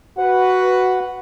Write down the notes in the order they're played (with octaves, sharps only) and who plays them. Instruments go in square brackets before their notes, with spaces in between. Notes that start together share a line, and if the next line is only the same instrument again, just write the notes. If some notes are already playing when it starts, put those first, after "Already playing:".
[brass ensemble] F#4 B4 [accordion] F#5